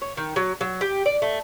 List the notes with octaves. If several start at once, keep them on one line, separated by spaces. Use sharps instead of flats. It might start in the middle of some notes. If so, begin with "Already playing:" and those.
C#5
D#3
F#3
F#3
G4
D5
A3